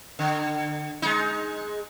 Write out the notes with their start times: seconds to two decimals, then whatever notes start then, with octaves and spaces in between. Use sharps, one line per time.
0.19 D3
1.02 G#3 D#4